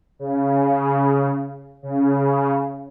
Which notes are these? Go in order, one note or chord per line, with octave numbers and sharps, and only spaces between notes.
C#3
C#3